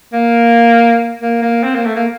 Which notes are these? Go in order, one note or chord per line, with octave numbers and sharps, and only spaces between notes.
A#3
A#3
A#3
C4
A#3
A3
A#3